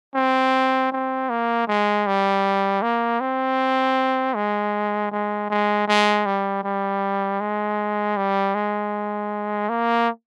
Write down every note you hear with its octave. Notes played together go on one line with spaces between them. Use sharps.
C4
C4
A#3
G#3
G3
A#3
C4
G#3
G#3
G#3
G#3
G3
G3
G#3
G3
G#3
A#3